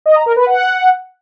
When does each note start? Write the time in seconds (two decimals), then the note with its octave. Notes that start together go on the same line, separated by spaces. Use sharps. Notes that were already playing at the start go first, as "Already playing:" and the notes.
0.06 D#5
0.16 A#5
0.26 A#4
0.36 B4
0.46 F#5